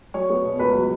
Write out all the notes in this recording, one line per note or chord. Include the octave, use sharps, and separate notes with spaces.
F#3 C#5 C#6
B3
B2
C#2 B4 B5
F#3 B5